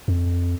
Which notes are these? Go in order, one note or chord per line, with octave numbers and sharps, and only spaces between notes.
F2